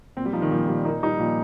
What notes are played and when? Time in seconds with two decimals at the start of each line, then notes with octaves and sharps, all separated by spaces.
0.17 A#2 C4
0.25 G3
0.33 F3 D#4
0.42 D#3
0.51 A#2 F3
0.68 A#2 G3
0.85 A#3 D#4
1.03 G3 D#4
1.20 A#2 F3